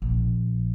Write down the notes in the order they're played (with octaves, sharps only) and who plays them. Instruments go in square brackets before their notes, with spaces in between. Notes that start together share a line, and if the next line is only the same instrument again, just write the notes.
[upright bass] A#1